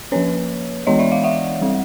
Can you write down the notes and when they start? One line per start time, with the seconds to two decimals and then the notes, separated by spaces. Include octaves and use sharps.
0.12 F3 A#3 C#4 B4 C#5
0.87 E3 G#3 B3 D4 C#5 D#5
0.99 D5 E5
1.12 D#5 F5
1.24 E5 F#5
1.61 G3 C4